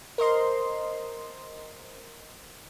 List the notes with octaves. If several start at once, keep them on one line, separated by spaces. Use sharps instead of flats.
A#4 C5 D#5 C6